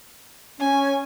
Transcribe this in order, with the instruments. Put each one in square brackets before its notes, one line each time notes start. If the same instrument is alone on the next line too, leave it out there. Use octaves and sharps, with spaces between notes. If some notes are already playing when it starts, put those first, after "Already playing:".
[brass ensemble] C#4 [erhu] G#5